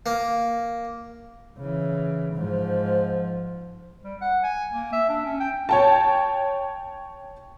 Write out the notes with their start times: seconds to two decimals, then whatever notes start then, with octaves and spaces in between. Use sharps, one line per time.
0.06 A#3
1.57 C#3 E3
2.34 G#2 F3
4.04 G3
4.21 F#5
4.44 G#5
4.72 A#3
4.93 E5
5.09 D4
5.26 C#4
5.40 G5
5.69 C#5 G5 A5